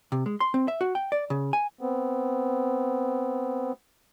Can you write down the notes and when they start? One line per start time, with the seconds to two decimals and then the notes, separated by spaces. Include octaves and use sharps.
0.12 C3
0.26 G#3
0.40 C6
0.54 C4
0.68 E5
0.81 F#4
0.95 G5
1.12 D5
1.30 C#3
1.53 G#5
1.81 B3 C4